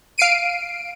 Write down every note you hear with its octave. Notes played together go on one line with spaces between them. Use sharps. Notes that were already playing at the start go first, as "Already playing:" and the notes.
F5 C7 D7 D#7